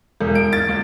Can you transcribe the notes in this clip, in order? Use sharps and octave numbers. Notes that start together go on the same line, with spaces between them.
E1
D7
A6
C#2